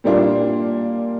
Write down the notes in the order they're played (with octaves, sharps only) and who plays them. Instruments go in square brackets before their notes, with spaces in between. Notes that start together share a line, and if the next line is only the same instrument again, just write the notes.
[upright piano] A#2 G3 A#3 D4 F4